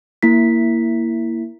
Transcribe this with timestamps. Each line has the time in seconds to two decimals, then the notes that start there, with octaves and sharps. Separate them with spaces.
0.23 A#3 E4 B6